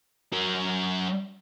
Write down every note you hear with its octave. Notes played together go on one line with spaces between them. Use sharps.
F#3 A#4